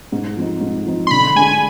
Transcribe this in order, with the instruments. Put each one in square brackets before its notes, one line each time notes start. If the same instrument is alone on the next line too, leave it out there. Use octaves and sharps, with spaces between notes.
[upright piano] G#2
F3 C4 D#4
G#2
F3 C4 D#4
[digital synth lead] C6
[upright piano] D3 [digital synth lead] B5
[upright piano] G#3 D4 G#4 [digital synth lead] G#5